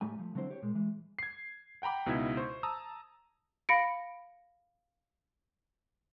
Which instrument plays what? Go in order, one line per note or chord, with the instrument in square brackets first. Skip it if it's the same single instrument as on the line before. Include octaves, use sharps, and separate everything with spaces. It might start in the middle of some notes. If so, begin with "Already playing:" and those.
[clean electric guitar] A2 G3 A3 G#5
F3 A3
D3 F#3 C4 E4 C5
G4 C#5
A#2 G#3
E3 G#3
[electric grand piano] G#6 C7
F#5 G5 A#5 B5 D6
C#2 B2 D#4 E4 E5 G#6
C5 C#6
A5 A#5 D#6 E6
[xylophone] F5 B5 A#6 C#7 D7